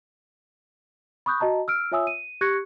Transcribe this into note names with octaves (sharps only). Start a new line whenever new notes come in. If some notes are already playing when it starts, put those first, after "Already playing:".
B5 C#6 D#6 F#6 G6
F#4 D#5 A5 A#5
E6 F6 D7
F4 C#5 E5 G#5 D#6 E6
D#7
G4 C#6 F#6 G#6 A#6 C#7